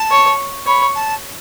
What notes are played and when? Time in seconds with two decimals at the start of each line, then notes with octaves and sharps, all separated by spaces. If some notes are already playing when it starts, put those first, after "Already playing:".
Already playing: A5
0.11 C#5
0.66 C#5 B5
0.94 A5